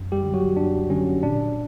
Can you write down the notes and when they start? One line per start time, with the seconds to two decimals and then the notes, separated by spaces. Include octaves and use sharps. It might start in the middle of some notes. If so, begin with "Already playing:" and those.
Already playing: F#2
0.12 G3 G4
0.23 D3 F#3
0.34 F#3 F#4
0.56 F#2 D4
0.90 D3 F#3 C#4
1.23 A#2 D4